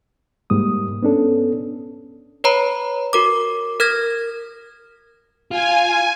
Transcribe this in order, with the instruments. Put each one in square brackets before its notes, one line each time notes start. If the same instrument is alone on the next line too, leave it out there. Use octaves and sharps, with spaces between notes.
[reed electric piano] G#2 G3 A#3 D#6
B3 C#4 D4 A4
[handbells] B4 C#5 A#5 B5
F#4 A#4 D6
A#4 F6 G#6 A#6
[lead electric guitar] F4 [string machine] G#5